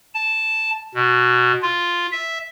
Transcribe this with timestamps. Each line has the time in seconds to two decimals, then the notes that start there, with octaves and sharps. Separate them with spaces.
0.14 A5
0.95 B2
1.62 F4
2.12 E5